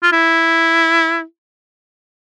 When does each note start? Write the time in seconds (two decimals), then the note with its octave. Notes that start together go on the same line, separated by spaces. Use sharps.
0.03 F4
0.12 E4